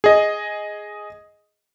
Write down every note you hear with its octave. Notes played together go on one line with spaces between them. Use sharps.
G#4 D#5